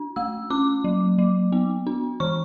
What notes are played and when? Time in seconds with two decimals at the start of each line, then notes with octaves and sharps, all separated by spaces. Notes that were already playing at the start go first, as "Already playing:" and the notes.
Already playing: D4
0.16 A3 E6
0.50 C#4 D6
0.84 F#3
1.18 F#3
1.52 B3
1.87 D4
2.20 E3 C#6